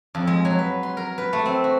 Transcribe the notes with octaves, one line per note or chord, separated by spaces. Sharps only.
F2
G#3
F#3
B4
C6
A#4
B4
A3
C4
F#4